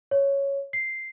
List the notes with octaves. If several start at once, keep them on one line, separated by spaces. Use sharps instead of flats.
C#5
C7